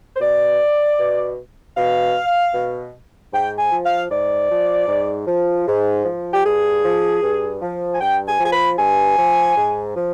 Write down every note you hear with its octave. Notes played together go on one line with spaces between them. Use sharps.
C5
B2 D5
B2
B2 F5
B2
G#2 G5
G#5
F3
F5
G#2 D5
F3
G#2
F3
G#2
F3
G4
G2 G#4
F3
G2
F3
G#5
G2 G5
G#5
F3
G#5
B5
G2 G#5
F3
G#2
F3